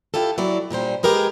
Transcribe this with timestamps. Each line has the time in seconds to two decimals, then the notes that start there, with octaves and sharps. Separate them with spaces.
0.14 E4 F4 G4 A4
0.38 F#3 E4 D5
0.71 A#2 D3 G3 C5
1.03 G#3 G4 G#4 A#4 B4 D#5